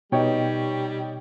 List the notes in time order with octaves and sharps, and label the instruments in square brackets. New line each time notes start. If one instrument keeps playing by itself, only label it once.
[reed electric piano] B2 [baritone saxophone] G3 [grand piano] D#4 C#5 G5